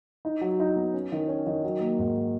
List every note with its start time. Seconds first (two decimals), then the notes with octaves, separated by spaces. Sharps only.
0.25 D#4
0.41 F#3
0.60 D#4
0.76 B3
0.94 C#4
1.12 D#3
1.28 C#4
1.47 D#3
1.64 F#3
1.80 A#3
1.99 G#2